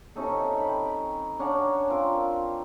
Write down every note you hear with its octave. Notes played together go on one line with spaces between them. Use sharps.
C3 C#4 D#4 A4
G5 B5
C#4 D4 F#5 A#5
C4 F4 A#4